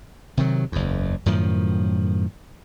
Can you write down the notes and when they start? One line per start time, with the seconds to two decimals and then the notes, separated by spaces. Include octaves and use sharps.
0.37 C3 D#3 F#3
0.72 F#1 E2
1.26 F#2 A2 D#3 F3